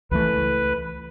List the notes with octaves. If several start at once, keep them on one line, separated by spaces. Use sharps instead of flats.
C#2 E3 A3 B4